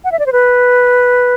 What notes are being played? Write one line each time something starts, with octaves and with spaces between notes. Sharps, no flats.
F#5
E5
D5
C5
B4